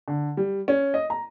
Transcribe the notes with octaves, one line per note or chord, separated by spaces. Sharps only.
D3
G3
C#4
D#5
A#5